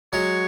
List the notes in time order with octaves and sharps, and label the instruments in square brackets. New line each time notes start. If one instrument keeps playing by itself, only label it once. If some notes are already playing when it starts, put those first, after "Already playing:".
[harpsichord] F#3 G#3 [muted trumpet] C#5